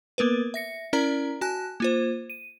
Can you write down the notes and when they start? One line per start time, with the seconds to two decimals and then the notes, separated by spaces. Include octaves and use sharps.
0.18 A#3 B3 A#4 B4
0.54 E5 A#6 C#7
0.93 C#4 E4 A#4 D5 A#5
1.41 F#4 G#5 A5 F#6
1.80 A#3 F4 C5
2.30 D#7